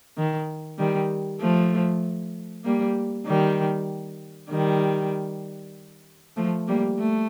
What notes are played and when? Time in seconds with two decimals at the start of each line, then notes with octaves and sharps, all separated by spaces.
0.17 D#3
0.78 D#3 G3
1.40 F3 A3
2.64 G3 A#3
3.26 D#3 G3
4.50 D#3 G3
6.36 F3 A3
6.68 G3 A#3
6.98 A3